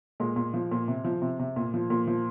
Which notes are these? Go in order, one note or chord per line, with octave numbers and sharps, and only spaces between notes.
A#2 G#3
A#2
F3
A#2
C3
F3
C3
C3
A#2
F3
A#2
F3